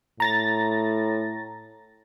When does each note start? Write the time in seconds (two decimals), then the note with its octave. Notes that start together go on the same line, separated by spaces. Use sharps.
0.20 A2 A#5 A6 A#6